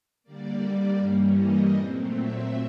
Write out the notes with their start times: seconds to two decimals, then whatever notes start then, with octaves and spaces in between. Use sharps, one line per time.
0.23 D3 G3 A#3 D5
0.98 G2 E3 G3 A#3 C#4
1.35 D#5
1.72 A#2 F#3 A3 C4
2.09 E5